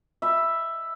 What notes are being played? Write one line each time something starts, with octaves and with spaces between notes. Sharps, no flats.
E5 B5